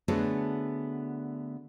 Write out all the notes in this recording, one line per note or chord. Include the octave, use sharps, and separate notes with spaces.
D3 A3 B3 F#4 G#4 C#5